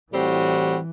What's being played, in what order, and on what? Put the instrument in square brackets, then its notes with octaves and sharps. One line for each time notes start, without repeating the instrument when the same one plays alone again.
[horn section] A2 G3 C4 F#4 [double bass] E3